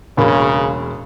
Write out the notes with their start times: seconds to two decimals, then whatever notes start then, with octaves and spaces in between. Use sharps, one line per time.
0.18 E1 C#3 A#3 B5